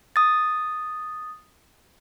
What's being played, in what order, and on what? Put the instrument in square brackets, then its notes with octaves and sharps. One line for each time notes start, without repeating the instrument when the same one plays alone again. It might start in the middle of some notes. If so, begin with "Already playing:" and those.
[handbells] D#6 A6